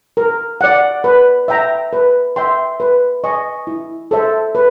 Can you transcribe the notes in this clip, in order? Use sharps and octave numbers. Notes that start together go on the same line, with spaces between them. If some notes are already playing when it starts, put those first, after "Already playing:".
A#4
D5 F#5
B4
E5 G5 A#5
B4
E5 G5 C6
B4
D#5 G#5 C#6
E4
A4 C5 E5
B4